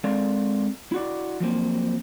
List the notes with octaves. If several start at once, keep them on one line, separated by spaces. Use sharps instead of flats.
G#3 C4 A4 A#4 D5 F5
E4 F#4 D5
F3 F#3 A#3 C4